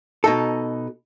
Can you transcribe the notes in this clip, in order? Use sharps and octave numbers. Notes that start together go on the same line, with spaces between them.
B2 D#4 A4